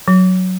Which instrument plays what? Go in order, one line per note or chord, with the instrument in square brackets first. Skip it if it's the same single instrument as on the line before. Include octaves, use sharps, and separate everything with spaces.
[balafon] F#3